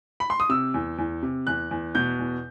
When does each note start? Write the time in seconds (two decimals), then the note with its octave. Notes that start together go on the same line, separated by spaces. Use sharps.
0.20 B5
0.30 C6
0.40 D#6
0.49 C3 E6
0.74 E2
0.98 E2
1.23 C3
1.47 E2 F#6
1.71 E2
1.95 B2 G6
2.19 E2